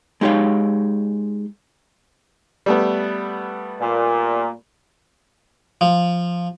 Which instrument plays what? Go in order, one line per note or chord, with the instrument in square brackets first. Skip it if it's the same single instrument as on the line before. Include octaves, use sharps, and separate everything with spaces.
[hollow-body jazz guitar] G#3 D#4 G4 C#5 F5
[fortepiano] G3 A3 B3
[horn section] A#2
[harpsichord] F3